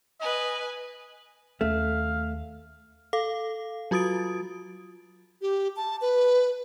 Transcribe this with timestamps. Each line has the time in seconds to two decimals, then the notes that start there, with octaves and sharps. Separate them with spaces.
0.21 B4 D#5 G#5
1.61 D#2 A3 C#4 F5
3.13 A4 F5 D6
3.91 F#3 F4 F#4 D#6 A6 D7
5.42 G4
5.76 A5
6.01 B4